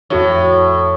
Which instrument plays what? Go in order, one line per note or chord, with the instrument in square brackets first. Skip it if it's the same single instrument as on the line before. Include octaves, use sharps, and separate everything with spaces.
[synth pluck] F2 F#4 C#5 [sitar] A2